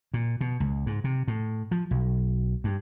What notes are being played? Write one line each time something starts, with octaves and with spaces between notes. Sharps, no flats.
A#2
B2
C#2
G#2
C3
A2
F3
B1
G2